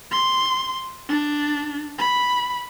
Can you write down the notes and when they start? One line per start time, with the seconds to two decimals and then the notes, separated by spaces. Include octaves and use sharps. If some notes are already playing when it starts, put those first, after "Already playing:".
0.11 C6
1.09 D4
1.98 B5